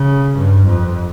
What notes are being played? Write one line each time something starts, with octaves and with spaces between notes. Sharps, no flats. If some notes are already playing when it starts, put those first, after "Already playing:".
Already playing: C#3
G2
F2